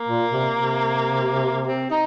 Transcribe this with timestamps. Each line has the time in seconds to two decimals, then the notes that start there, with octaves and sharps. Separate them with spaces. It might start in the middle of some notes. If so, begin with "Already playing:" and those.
Already playing: A#3
0.08 A#2
0.31 C3
0.54 C3
1.68 C4
1.90 D#4